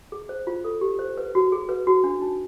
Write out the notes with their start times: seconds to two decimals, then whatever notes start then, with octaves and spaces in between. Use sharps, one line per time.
0.12 G#4
0.29 C5
0.47 F4
0.64 A4
0.81 G4
0.99 C5
1.18 B4
1.35 F#4
1.52 G#4
1.69 B4
1.87 F#4
2.04 D4
2.22 D#4